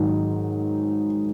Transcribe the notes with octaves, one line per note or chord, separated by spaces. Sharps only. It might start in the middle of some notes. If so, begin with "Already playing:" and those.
Already playing: G#2 D#3 F#3 D#4